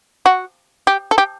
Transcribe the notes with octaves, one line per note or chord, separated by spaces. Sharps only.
F#4
G4
A4
G4